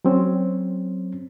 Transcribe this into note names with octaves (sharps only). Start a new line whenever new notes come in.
F#3 C4 C#4